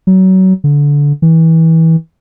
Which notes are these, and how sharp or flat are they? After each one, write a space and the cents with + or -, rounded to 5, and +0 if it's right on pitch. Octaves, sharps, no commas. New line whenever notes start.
F#3 +25
D3 -20
E3 -25